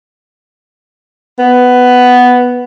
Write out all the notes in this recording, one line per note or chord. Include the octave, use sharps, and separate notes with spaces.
B3